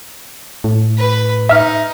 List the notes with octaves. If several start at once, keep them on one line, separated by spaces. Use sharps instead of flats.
A2
B4 B5
D#4 E5 F6